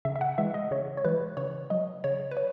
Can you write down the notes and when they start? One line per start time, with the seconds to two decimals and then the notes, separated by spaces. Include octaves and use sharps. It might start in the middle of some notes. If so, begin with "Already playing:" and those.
0.05 C#3 E5
0.16 E5
0.21 F#5
0.38 E3 G#3 E5
0.54 D#5
0.71 C#3 C#5
0.97 C#5
1.05 E3 G#3 B4
1.37 C#3 C#5
1.70 F#3 D#5
2.04 C#3 C#5
2.31 B4
2.37 C#5